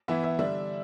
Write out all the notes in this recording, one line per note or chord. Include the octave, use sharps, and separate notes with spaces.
E3 B3 E4 E5
E5
D3 G3 D4 E5